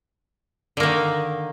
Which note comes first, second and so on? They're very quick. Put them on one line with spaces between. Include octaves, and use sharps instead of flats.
D3 A#3 D#3